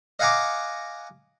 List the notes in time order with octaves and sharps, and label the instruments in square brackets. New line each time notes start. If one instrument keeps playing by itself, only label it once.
[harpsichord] D#5 F5 F#5 G#5 A#5 D6